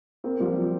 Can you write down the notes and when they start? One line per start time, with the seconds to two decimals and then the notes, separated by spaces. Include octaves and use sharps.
0.24 A#3 C4
0.40 F3 G3
0.56 F#3